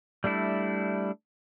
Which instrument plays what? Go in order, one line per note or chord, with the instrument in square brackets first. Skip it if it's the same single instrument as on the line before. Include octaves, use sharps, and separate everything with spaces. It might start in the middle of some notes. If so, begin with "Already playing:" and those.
[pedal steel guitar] G3 A3 D4 E4